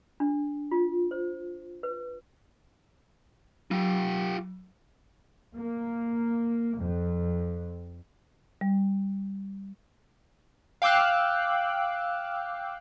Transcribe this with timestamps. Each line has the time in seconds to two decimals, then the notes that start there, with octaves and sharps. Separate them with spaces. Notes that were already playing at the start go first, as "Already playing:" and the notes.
0.20 D4
0.71 F4
1.11 C5
1.83 B4
3.71 F#3 F4 G4
5.56 A#3
6.81 F2
8.61 G3
10.82 F5 G5 D6 E6 F#6